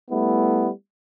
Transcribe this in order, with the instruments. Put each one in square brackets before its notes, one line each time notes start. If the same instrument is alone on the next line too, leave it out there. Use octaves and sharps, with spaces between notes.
[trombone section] G3 A3 B3 E4